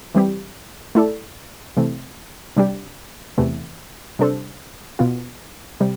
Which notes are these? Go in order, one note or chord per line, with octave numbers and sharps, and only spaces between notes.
E3 G3 C4 G4
A3 E4 A4 D5
C3 E3 A3 C4
C3 G3 D4 G4 D5
E2 C3 E3 A3
C3 G3 D4 A4 C5
B2 B3 F4
C3 G3